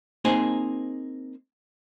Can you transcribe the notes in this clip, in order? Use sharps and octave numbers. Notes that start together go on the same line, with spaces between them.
A#3 C4 D#4 G#4 C5 D#5